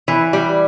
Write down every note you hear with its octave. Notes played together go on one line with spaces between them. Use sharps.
E3
G3